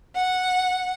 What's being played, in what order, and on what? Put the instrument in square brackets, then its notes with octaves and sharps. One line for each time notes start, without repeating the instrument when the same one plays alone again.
[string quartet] F#5